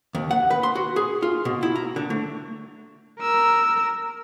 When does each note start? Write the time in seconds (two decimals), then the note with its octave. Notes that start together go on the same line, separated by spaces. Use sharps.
0.15 D#2
0.31 F#5
0.51 B4
0.63 C6
0.75 F#4
0.96 G#4
1.22 F4
1.45 B2
1.63 E4
1.76 A#5
1.96 D3
2.10 A3
3.20 A#4 E6